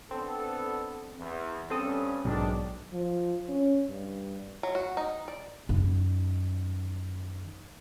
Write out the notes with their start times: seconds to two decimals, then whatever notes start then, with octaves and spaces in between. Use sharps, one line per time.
0.11 B3 C4 D4 A4
1.19 E2
1.70 G2 C4 C#4 A4 D#6
2.25 B1 G#2 D#3 D4
2.93 F3
3.49 C#4
3.87 G2
4.63 F#3
4.75 F#4
4.97 D#4
5.28 D5
5.69 F#2 D#3